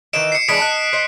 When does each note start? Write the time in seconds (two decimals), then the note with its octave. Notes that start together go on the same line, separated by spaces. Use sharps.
0.13 D#3 E3 D#5 D7 E7
0.32 C7 C#7
0.48 E3 G#3 D4 D#6 B6 D7
0.62 D#5 F#6
0.93 C5 D#5